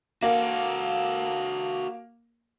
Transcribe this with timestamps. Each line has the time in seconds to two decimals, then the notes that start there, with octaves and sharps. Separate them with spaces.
0.22 A#3 F#4 A4